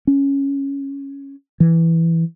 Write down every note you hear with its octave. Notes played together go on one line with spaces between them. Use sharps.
C#4
E3